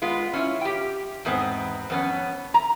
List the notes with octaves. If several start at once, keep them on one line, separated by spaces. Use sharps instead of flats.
G#3 B3 F4
C#4 E4 F4
G4 G5
E2 G#2 B3 C4
F2 B3 C#4
A#5